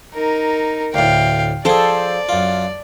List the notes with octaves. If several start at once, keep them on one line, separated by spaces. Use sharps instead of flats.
D#4 A#4
D2 A2 F5 G5
F3 G#4 A4 C5 D5 G5
F#2 F4